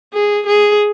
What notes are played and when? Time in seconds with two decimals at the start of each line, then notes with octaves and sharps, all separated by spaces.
0.14 G#4
0.47 G#4